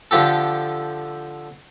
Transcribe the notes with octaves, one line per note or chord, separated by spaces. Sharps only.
D3 F3 G4 A4